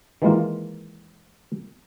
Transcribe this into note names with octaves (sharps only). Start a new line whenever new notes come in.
D#3 E3 G#3 A#3 F4